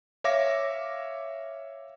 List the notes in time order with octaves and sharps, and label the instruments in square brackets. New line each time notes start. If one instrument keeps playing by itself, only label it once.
[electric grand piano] C#5 E5 F5 D6 A#6